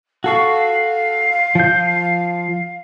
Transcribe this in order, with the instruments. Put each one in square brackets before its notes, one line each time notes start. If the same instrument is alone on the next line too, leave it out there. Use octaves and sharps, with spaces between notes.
[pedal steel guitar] F#4 A4 C#6 [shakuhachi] F5
[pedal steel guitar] F3 G6